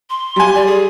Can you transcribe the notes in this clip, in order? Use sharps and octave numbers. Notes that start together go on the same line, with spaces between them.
C6
G3 G#5
D5
G#4